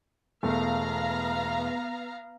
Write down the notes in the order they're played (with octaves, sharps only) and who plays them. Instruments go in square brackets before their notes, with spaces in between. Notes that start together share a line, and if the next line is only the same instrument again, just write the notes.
[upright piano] E1 A3 [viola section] B3 F5 A#5